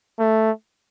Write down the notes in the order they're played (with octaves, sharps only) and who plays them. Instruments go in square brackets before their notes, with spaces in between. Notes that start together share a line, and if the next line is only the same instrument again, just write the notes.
[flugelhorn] A3